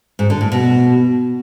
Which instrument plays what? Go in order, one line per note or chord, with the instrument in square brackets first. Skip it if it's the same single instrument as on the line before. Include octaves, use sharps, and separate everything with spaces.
[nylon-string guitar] G#2
D3
A2
B2